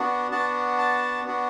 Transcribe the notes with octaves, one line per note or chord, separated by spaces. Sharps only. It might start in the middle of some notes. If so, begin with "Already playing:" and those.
Already playing: B3 D4 F#4
B3 D4 F#4 A5
A5
B3 D4 F#4